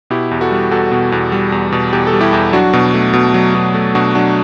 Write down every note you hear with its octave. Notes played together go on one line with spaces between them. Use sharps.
B2 E4 G4
E2
F#4 A4
G3
E2 F#4 A4
B2
E2
G3
E2
B2
E2 G4
A4
G3
E4 G4
E2
F#3 D4 F#4
B2
A3
B2
F#3
B2
A3
B2 D4 F#4
F#3 D4